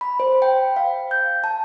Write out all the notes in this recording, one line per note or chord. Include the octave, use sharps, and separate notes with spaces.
B5
C5
G5
F5
G6
A5